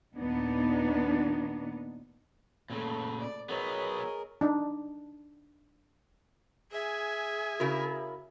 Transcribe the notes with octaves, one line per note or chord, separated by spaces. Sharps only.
D#2 A#2 B3 D4 D#4
A#2 C#3 A3 A4
D5
F#3 B3 G#4 A#4 C#5 D#5
D4 D#4
G#4 E5 G#5
C#3 E4 F#4 A#4